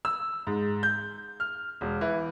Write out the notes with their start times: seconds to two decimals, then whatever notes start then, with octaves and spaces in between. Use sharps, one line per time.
0.05 E6
0.47 G#2
0.83 G6
1.40 F6
1.81 E1
2.01 E3